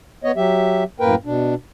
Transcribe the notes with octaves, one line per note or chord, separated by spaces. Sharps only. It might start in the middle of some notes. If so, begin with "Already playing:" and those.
B3 C#5 D#5
F#3 G4 E5
F#2 A2 A#3 A#4 B4 G5
B2 D4